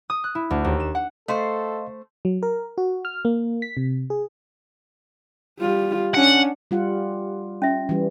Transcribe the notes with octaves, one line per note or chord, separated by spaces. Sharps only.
D#6
F#6
E4
D2
D#2
E7
F#5
A3 A4 C5 D#5 F5 C6
F#3
A#4
F#4
F6
A#3
B6
C3
G#4
G3 F4
C#4 D4 F#5
G3 F4 F#5
C#4 E5
E3 G3